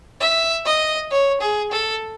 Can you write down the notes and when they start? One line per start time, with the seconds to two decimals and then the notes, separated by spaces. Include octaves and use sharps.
0.20 E5
0.65 D#5
1.11 C#5
1.41 G#4
1.71 A4